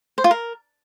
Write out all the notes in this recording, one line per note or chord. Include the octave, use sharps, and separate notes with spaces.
C5
F4
A#4